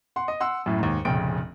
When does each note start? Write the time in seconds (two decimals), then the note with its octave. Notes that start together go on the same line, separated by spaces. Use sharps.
0.16 F#5 C6
0.28 D#5
0.40 F#5 C6 E6
0.66 F#2 A2 E4
0.79 D#2 G#2
1.05 F1 A#1 C#3 G5 D7